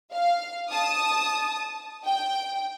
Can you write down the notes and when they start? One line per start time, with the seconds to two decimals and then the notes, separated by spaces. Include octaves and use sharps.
0.12 F5
0.70 A5 D#6
2.05 G5